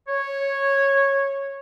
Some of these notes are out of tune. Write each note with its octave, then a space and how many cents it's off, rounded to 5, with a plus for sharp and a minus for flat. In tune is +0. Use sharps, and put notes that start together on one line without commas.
C#5 -10